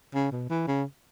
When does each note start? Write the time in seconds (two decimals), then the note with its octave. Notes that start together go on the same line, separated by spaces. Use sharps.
0.15 C#3
0.32 B2
0.50 E3
0.68 C#3